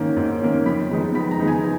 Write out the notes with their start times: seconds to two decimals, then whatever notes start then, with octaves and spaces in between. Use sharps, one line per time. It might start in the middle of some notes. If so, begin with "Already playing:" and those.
Already playing: G#2 D#3 A#3 C#4
0.17 G#2
0.40 D#3 A#3 C#4
0.66 F2 B5
0.90 D#3 G#3 B3 D#4
1.14 F2 B5
1.31 A#5
1.40 D#3 G#3 B3 D#4
1.48 G#5